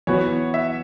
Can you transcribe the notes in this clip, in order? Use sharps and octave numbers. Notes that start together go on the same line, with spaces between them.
E3 B3 F#4 B4 C#5
E5